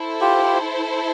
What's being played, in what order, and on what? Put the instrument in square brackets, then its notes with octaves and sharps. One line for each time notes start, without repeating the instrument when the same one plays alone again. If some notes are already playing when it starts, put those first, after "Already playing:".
Already playing: [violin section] E4 A4 C5
[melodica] F4 G4